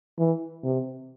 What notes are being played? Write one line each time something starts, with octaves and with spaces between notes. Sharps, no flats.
E3
C3